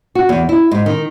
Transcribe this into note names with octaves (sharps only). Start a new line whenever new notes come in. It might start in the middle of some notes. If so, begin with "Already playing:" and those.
F#4
E2
E4
G#2
D#3